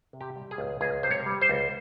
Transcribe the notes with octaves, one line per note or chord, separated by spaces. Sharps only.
C3
G4
G3
G#4
C#2
C#2 G#4
C3 C5
C#5
G3
C5
C#2